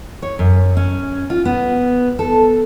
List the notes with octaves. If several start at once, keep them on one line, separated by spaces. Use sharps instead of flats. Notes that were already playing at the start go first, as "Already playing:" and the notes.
C#5
F#2
C#4
F4
B3
A4